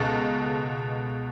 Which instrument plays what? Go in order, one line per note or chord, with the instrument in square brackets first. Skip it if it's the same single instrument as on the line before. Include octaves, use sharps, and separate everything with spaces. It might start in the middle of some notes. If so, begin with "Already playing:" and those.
Already playing: [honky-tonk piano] C#2 B2 G#3 A4